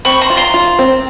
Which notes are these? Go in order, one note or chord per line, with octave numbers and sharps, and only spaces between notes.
C4 B5 C#6
A#5 C6
F4
A#5 C6
F4
C4